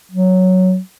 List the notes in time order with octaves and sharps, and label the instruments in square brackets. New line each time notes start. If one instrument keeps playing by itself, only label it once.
[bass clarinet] F#3